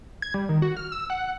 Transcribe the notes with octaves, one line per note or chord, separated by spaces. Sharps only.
G#6
G3
D#3
F#4
F6
E6
F#5